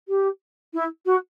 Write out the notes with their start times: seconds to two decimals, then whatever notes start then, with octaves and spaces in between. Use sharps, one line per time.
0.08 G4
0.73 E4
1.05 F#4